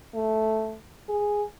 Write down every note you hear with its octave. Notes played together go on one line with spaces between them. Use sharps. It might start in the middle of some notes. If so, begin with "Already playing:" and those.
A3
G#4